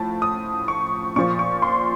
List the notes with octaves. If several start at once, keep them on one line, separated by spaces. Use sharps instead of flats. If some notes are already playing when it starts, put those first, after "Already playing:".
Already playing: A2 F3 A5
D#6
C#6
A#2 F3 C#6
C#6
C6